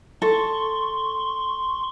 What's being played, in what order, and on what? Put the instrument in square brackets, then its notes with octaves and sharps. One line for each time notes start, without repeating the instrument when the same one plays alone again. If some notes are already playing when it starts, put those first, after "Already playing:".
[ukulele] A4 [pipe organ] C6 C#6